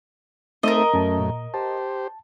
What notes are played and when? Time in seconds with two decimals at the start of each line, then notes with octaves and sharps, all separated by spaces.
0.63 A3 C4 D#4 A4 A#4 C5 D#5 E5
0.93 F#2 A3 C#4 A5
1.19 A#2
1.54 G4 C5 A5